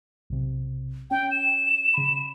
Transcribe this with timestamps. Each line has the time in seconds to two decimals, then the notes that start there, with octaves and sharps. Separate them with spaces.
0.30 B1 C3
1.11 C#4 G5
1.31 E7
1.94 C#3 B5